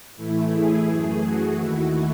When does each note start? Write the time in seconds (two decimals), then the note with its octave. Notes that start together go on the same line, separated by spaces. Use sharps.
0.16 A2 E3 A3 E4
0.51 G#4
0.86 F#2 E3 A3
1.22 F#4
1.57 D#2 D#3 A3 E4